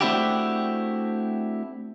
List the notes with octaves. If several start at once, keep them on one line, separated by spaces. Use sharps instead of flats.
A3 C4 D4 E4 F#4 G4